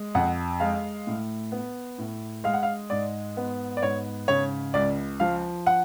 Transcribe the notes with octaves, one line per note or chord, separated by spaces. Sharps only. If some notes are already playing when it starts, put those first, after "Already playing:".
Already playing: G#3
F2 F#5
G#3 F5
A2
B3
A2
G#3 F5
F#5
F5
G#2 D5
B3
D5
G#2 C#5
C#3 C#5
C#2 D5
F3 F5
F#5